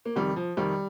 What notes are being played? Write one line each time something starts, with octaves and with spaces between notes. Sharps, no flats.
A#3
F2 C3 D#3 G3
F3
F2 C3 D#3 G3